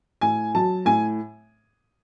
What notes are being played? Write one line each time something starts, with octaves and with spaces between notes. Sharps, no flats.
A2 G#5
F#3 A5
A2 G#5